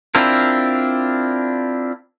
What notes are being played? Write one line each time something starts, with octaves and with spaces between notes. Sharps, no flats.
C4 D4 E4 F4 A#4